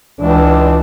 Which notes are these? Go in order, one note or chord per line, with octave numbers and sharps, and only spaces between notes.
C#2 E3 D4